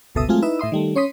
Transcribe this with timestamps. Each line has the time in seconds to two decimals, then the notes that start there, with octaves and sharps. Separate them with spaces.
0.15 G1 C#2 B2 A4 E5 D#6
0.28 F#3 G#3 A3 C4 F4 G#4
0.42 D#4 E4 B4 E5
0.59 A2 E5 C6 D#6
0.72 D#3 G3 A3
0.95 C#4 C#5 C6 D#6 B6